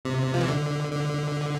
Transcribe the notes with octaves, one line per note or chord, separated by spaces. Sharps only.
C3
F3
E3
D3
D3